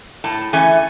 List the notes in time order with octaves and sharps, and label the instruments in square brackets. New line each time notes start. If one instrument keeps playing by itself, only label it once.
[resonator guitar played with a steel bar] A2 A5
E3 A3 C#4 G#5